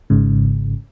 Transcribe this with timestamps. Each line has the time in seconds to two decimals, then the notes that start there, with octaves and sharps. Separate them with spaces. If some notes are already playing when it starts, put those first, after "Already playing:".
0.10 G#1 G#2 C#3